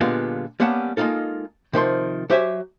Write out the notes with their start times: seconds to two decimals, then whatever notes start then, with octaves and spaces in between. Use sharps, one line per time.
0.01 A#2 D3 G3 G#3 B3 F4
0.60 G3 A#3 B3 C#4 F#5 A5
0.97 G#3 A#3 D#4 F4 A4
1.73 C3 D#3 F3 C6
2.30 F#3 G4 C5 E5 F#5 G#5